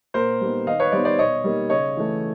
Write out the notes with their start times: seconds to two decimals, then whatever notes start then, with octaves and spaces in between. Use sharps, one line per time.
0.14 A#2 A#4 C5
0.41 G3 B3 D#4
0.66 D#3 D#5 F5
0.80 B4 C#5
0.92 G3 B3 D#4 C5 D5
1.05 C5 D5
1.19 B2 C#5 D#5
1.44 G3 A#3 D#4
1.70 C#3 C#5 D#5
1.97 E3 A3